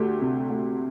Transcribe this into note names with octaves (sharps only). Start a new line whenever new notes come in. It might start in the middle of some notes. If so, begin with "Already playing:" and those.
Already playing: D2 A3 G4
C3
A3